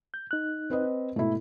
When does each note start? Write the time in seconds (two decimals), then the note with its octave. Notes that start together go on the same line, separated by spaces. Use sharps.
0.14 G6
0.31 D#4 F#6
0.70 C4 B4 D#5
1.16 G#2 B2 A3 E4